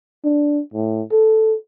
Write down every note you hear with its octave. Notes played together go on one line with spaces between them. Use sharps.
D4
A2
A4